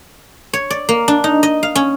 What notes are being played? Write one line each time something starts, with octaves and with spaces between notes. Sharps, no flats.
C#5
D5
A#3
D4
D#4
D#5
F5
C#4